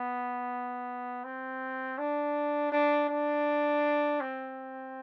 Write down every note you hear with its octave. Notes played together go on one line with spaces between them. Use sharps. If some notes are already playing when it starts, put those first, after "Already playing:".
Already playing: B3
C4
D4
D4
D4
C4